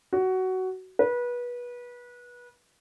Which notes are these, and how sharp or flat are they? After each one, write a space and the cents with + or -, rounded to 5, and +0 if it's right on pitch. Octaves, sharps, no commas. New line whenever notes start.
F#4 +15
B4 -25